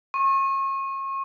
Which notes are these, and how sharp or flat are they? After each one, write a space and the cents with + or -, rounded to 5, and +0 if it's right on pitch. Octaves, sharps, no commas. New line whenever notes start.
C#6 -35